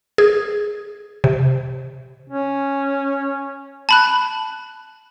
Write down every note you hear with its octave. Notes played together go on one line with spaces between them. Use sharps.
G#4
C3
C#4
A5 B5 F#6